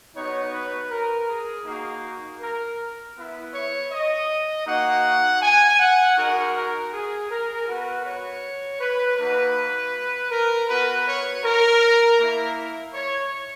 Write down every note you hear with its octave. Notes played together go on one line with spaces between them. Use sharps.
B3 D#4 F#4 C#5
B4
A#4
G#4
A#3 D#4 F#4
A#4
B3 E4
C#5
D#5
A#3 D#4 F#4 F#5
G#5
F#5
G#3 D#4 F#4 A#4
A#4
G#4
A#4
B3 F#4 B4
C#5
B4
A#3 D#4 F#4 B4
A#4
B3 F#4 B4
C#5
A#4
A#3 E4
C#5